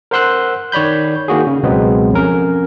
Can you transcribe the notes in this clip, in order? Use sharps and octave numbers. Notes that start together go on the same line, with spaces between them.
A#4 C5 F#5 C6 E6 F#6
D#3 C#5 D5 B5 G6
D#3 A#3 F#4 G#4
C#3
C#2 B2 F#3 G#3 B3 C4
F2 C#4 A#4